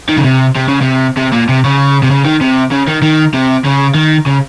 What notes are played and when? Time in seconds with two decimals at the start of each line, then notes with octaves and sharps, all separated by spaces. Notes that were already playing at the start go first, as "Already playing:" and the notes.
0.09 D#3
0.18 C#3
0.25 C3
0.56 C3
0.68 C#3
0.81 C3
1.17 C3
1.32 A#2
1.49 C3
1.64 C#3
2.03 C3
2.11 C#3
2.25 D#3
2.41 C3
2.72 C#3
2.88 D#3
3.02 D#3
3.34 C3
3.64 C#3
3.95 D#3
4.26 C#3